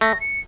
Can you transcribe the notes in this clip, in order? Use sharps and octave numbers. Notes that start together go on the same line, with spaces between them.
A3 A#6
C#7